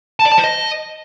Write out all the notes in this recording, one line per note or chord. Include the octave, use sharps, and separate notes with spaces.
A5
D5
A5
C5
D#5